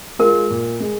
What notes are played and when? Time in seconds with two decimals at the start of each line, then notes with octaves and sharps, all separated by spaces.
0.19 G#3 F4 A#4
0.50 A#2
0.80 G#3